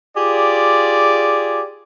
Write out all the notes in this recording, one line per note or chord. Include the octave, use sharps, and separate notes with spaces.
F4 G4 G#4 D5